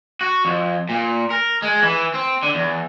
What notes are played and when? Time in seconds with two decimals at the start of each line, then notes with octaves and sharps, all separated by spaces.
0.21 F#4
0.45 F2
0.89 A#2
1.30 A#4
1.62 G#3
1.82 E3
2.14 C4
2.43 D3
2.55 E2